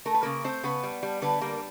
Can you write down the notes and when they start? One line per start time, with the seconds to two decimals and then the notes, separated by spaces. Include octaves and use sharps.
0.06 A3 A#4
0.14 B4
0.23 C#3 A#3 A#4
0.44 A3 C4 C5
0.63 C#3 B3 B4
0.83 G3
1.03 G3
1.22 D3 B3 B4
1.41 G3 A#3 A#4